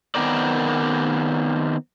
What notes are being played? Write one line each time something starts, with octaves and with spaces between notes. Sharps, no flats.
D#3 B3 C4 A#4 D5